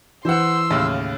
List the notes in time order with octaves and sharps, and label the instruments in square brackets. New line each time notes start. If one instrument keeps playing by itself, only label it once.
[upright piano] E3 [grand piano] C5 F#5 [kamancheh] C6 E6
[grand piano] D#2 A2 C#3